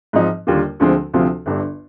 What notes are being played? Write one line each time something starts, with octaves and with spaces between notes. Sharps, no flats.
G#2 F3 C4 D#4
D#2 D3 G3 A#3 F4
D2 D3 F3 G#3 C4
D2 C3 F3 C4 F4
G1 G2 D3